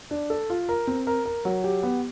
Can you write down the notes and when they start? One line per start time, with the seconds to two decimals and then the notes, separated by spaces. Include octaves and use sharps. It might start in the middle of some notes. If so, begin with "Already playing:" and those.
0.11 D4
0.30 A4
0.50 F4
0.69 A#4
0.87 C4
1.07 A#4
1.25 A#4
1.45 F#3
1.64 G4
1.83 B3